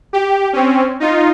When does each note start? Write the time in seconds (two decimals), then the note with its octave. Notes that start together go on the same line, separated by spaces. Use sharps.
0.13 G4
0.53 C4 C#4
1.00 D#4 F4